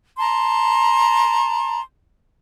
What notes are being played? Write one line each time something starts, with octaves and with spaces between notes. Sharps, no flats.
A5 A#5 C6